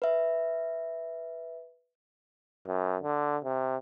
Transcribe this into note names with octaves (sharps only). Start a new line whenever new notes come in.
B4 E5
F#2
D3
C3